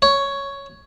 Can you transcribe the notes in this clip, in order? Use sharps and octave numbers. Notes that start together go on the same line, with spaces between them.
C#5